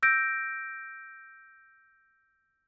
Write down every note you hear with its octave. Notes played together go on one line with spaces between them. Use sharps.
E6 G6 A#6 D7